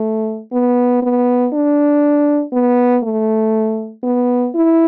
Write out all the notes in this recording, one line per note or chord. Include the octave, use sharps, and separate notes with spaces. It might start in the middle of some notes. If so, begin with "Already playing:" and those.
Already playing: A3
B3
B3
D4
B3
A3
B3
E4